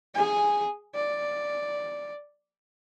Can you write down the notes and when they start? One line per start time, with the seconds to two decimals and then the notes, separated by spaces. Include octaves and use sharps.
0.15 G#4 G#5
0.95 D5